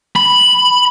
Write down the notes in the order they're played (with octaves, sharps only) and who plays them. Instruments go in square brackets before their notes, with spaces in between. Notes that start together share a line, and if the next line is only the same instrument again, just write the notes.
[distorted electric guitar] B5